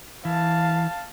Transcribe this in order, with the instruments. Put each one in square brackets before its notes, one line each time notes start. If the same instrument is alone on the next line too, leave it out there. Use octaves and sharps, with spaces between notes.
[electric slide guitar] E3 [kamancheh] F5 A5